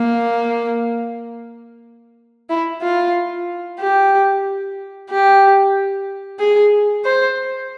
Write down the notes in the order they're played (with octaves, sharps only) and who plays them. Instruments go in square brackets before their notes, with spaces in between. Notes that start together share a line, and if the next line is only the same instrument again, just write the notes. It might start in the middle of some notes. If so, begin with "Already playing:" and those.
Already playing: [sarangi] A#3
E4
F4
G4
G4
G#4
C5